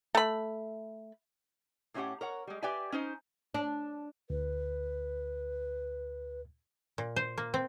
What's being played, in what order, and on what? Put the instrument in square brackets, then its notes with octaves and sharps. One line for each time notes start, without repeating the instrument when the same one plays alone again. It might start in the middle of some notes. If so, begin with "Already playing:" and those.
[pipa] A3 B5
[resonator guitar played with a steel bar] A2 E3 C#4 D#4 G4 F#5
A#4 C#5 F#5
G3 G#3
G4 B4 D5 E5 G5 G#5
C#4 D#4 C5
[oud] D4
[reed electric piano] D2 [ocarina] B4
[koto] A#2
C5
A#3
C4